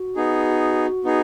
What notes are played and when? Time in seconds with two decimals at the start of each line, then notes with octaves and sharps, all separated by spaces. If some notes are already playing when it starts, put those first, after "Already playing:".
Already playing: F#4
0.16 B3 D#4 G#4
1.04 B3 D#4 G#4